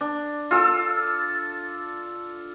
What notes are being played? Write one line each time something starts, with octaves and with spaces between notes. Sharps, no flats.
D4
F4 A4 E6